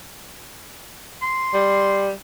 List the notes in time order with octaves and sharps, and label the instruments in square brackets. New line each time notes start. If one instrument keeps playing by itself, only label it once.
[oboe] C6
[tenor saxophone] G3